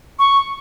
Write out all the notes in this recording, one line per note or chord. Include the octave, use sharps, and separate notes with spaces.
C#6